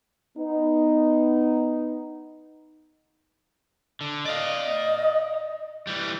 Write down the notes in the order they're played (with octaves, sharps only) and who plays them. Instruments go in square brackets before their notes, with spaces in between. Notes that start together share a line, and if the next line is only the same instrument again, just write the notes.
[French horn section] B3 D#4
[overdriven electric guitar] D3
[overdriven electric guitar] D5 F5 [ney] D#5
[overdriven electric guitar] E3 G3